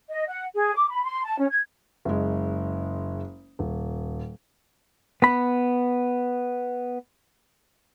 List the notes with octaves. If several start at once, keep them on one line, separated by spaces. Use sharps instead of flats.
D#5
F#5
G#4
D6
B5
C6
A5
C#4
G#6
F#1 G#3
D#1
B3 B5